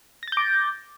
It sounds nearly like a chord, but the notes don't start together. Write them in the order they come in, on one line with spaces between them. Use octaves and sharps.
A#6 A6 G6 D6